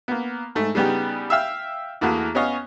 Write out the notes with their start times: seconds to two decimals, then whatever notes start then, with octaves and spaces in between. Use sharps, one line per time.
0.08 A#3 B3
0.55 G#2 A3
0.75 C#3 G3 B3 D#4 G4
1.30 E5 F5 G5 E6
2.01 E2 A3 A#3 F#4 A5
2.35 B3 C#4 C#5 D#5 F5